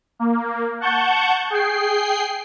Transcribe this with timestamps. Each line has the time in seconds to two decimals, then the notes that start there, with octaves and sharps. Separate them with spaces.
0.19 A#3
0.81 F#5 A5 C#6 G6
1.50 G#4 G5 C7